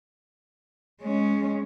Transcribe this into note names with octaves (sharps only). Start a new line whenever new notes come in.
G#3 C#4